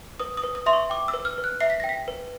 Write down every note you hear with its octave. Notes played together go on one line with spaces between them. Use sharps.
B4 D#6
D#6
B4
D#6
E5 C6
C#6
G5 D6
E6
B4
F6
B4
F#6
E5 C7
B6
G5 A#6
B6
B4